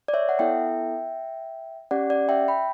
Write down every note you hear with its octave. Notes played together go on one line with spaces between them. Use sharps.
D5
C#5 E5
F#5
B3 E4 A4 E5 G5
C#4 G4 D5 F#5
D5 F#5
E5 G5
G5 B5